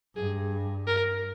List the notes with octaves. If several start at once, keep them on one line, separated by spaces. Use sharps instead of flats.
G2 G#4
A#4